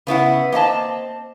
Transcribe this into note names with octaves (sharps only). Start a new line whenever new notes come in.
C#3 B3 E4 F#5
A#3 C4 D#5 A5